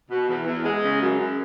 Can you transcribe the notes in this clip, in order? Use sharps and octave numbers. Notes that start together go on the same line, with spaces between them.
B2
E2
E2
G#3
C#3
F#2
F#2